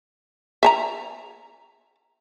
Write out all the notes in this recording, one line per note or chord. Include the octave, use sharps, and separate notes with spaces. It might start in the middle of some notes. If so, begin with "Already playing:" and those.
E5 A5 A#5